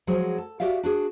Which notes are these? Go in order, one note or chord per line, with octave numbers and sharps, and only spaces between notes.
F3 F#3 G#3 G#4
A4
F#4 G4 D5 E5 F5
D4 F#4 G#4